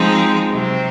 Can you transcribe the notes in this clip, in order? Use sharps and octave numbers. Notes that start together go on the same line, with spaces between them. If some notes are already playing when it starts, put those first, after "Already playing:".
Already playing: F3 G#3 C4 D#4
C3 F#3 C4